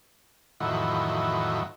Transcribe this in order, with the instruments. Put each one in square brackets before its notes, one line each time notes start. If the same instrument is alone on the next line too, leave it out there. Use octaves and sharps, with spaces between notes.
[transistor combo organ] F2 A2 D#3 E3 F#3